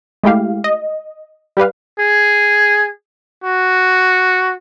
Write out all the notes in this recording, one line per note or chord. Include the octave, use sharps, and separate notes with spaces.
G#3 A3 E4 G4 F5
D#5
G3 G4 B4 F5
G#4
F#4